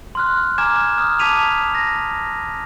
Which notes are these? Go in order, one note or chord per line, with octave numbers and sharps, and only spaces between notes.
C6 F6 F#6
G#5 A#5 D6 F6 G#6 E7
D#6 F6
A5 D6 G#6 B6 D#7 F7
A#6